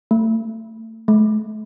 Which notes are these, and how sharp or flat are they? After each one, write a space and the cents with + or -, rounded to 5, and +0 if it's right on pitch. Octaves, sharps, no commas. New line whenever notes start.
A3 +30
A3 -40